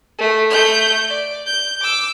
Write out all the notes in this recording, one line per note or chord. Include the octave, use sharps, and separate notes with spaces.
A3
A3 G6
D5
G6
D6 E6